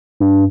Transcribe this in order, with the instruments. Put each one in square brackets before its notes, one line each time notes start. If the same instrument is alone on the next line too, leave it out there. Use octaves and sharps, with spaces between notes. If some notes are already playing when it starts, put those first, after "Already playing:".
[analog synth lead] G2